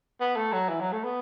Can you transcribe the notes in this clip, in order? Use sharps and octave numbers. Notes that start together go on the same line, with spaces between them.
B3
A3
F#3
E3
F#3
A3
B3